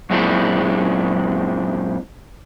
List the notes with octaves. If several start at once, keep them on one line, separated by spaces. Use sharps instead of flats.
F#2 A#2 G#3 C4 D4 E4